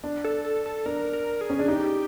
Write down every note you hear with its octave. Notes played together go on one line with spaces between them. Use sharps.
D4
A4
A4
A4
D4 A#4
A#4
G#4
C#4
D4
D#4 G4